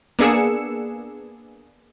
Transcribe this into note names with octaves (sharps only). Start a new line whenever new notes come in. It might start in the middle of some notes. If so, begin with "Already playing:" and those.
A#3 B3 D4 G#4 E6 C#7